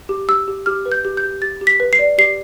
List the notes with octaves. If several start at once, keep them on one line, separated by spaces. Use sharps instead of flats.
G4
G4 E6
G4
G4 F6
B4
G6
G4
G6
G4
G4 A6
G4
B6
B4
C7
D5
G4 C7